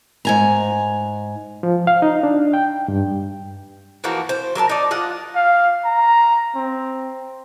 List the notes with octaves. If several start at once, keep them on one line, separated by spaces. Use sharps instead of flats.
G#2 G#5 A#5
F3
F5
D#4
D4
G5
G2
E3 F3 A#3 F#4
C5
F#3 A#4 C#5 A5
D#4 D5
F4 D#5 F#5
F5
A#5
C4